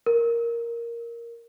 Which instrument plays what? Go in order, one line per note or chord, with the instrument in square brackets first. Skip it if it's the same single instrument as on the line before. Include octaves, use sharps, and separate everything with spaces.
[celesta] A#4